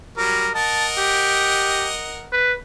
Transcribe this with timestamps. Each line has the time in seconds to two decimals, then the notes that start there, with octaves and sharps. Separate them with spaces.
0.17 F#3 G3 A#4
0.55 A#4 D#5 F#5 A5
0.98 G4
2.32 B4